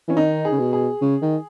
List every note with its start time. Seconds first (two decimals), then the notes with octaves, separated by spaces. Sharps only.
0.08 E3 C#4
0.16 D#3 D#4
0.45 G#4
0.52 C#3
0.59 B2
0.73 G#4
1.01 C#3
1.22 D#3